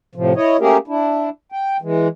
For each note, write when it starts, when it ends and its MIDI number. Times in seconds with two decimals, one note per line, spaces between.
0.15 0.33 45
0.15 0.33 48
0.15 0.33 53
0.36 0.57 64
0.36 0.57 73
0.36 0.57 75
0.60 0.77 57
0.60 0.77 58
0.60 0.77 61
0.60 0.77 67
0.60 0.77 68
0.60 0.77 70
0.88 1.30 62
0.88 1.30 64
1.52 1.77 79
1.82 2.08 52
1.82 2.08 56